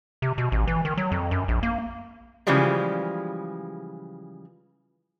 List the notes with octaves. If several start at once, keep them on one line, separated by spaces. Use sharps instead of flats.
C3
B2
A1
E3
D#3
F#3
F2
F#2
A#1
A#3
C#3 E3 F3 G3 G#3